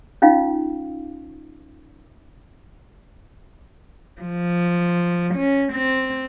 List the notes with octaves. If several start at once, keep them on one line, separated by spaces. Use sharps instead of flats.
C#4 D#4 F4 F5
F3
C#4
C4